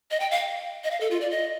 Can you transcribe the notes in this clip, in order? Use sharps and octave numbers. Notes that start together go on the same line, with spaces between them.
D#5
G5
F5
D#5
F5
A4
F4
D5
D#5